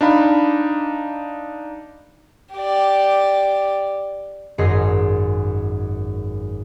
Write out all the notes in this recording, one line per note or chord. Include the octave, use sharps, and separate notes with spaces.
D4 D#4 F5 B5
G4 D5
G#1 F#2 G#4 D#5 C6 C7